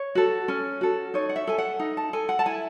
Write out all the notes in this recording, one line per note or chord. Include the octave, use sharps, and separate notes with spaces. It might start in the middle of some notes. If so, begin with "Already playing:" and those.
Already playing: C#5
F#4 A4
C#4
F#4 A4
D#4 C#5
F#5
E5
A4 G#5
F#5
D#4
A5
A4 G#5
F#5
A5
E4 G#5